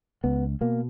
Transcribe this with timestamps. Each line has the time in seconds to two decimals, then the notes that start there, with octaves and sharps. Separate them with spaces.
0.24 C#2 B3
0.61 B2 A#3